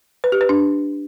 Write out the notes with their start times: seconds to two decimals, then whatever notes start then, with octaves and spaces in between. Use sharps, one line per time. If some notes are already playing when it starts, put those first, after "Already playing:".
0.24 B4
0.32 G4
0.41 B4
0.49 D4